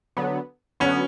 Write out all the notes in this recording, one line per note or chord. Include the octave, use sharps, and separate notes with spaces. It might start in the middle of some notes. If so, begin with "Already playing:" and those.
D3 F#3 B3
D3 F#3 B3 C#4